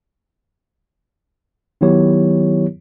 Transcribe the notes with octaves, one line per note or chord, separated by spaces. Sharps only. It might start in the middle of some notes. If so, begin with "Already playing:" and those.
D#3 F#3 B3 E4 G4 C#5